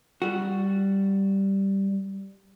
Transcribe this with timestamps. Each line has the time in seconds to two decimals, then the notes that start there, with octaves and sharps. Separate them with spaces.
0.22 G3 F#4